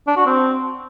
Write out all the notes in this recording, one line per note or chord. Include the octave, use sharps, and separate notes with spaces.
D4
F#4
C4